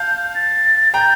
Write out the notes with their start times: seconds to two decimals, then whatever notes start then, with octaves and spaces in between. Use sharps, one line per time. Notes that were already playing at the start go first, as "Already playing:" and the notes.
Already playing: F5 A5 G6
0.35 A6
0.94 G5 A#5 G6